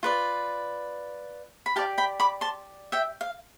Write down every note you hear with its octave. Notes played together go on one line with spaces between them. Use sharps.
F4 B4 D5
B5
G4 D5 F5 A5
G5 B5
B5 D6
A5 C6
E5 G5
F5